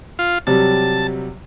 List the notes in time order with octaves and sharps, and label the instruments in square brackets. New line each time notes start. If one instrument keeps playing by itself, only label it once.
[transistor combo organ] F4
[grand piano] C3 F#3 G3 [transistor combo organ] A5